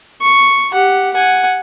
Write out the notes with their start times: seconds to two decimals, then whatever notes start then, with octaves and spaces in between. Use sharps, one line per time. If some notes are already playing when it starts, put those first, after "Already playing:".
0.22 C#6
0.73 G4 F#5
1.14 F#5 G#5